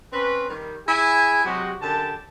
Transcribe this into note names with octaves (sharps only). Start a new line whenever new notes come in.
C4 C#4 B4
D#3 G3
E4 G#4 G#5
C3 F#3 G#3 F#4 G4
F#2 D3 G4 A5